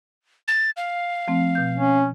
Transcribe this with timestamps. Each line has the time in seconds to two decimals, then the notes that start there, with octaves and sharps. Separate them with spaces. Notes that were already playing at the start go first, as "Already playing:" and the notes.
0.48 A6
0.77 F5
1.28 F3 A3 C4
1.55 B2 G6
1.76 C#4